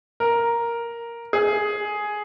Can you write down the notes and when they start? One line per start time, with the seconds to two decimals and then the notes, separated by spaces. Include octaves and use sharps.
0.20 A#4
1.33 G#4